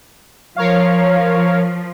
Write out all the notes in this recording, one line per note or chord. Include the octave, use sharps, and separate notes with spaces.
F3 A#4 C#5 F5